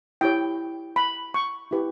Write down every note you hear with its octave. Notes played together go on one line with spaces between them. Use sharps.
E4 G4 C#5 G5
B5
C#6
E4 G4 B4